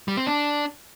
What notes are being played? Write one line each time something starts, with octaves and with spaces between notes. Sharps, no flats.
G3
C4
D4